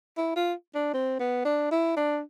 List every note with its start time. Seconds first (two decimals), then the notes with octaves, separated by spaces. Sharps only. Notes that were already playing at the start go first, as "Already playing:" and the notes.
0.17 E4
0.36 F4
0.75 D4
0.94 C4
1.20 B3
1.45 D4
1.71 E4
1.97 D4